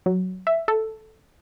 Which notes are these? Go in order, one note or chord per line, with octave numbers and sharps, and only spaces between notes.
F#3
E5
A4